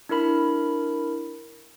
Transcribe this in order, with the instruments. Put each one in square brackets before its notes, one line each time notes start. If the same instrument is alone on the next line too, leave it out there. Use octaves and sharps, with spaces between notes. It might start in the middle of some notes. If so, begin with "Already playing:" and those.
[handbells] D4 E4 A#4 B5